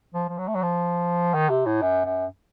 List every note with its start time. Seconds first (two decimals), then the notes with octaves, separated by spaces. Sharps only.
0.14 F3
0.28 F3
0.38 F#3
0.48 A3
0.55 F#3
0.63 F3
1.34 D#3
1.50 C3
1.66 A2
1.82 F#2
2.05 F#2